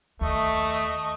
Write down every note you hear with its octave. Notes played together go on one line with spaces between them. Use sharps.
D#2 A3 D#5 C#6